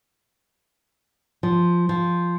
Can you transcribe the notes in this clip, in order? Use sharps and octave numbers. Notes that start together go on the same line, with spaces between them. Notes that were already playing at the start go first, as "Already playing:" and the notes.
F3
F3